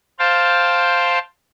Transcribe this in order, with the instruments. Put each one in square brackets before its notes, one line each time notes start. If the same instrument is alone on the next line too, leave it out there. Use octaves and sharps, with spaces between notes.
[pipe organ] C5 F5 G5 A5